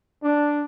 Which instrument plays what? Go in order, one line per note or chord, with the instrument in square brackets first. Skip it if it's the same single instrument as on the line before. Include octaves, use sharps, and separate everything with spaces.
[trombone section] D4